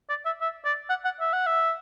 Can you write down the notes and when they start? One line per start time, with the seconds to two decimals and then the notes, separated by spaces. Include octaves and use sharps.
0.09 D5
0.26 E5
0.41 E5
0.65 D5
0.89 F#5
1.05 F#5
1.20 E5
1.33 F#5
1.46 E5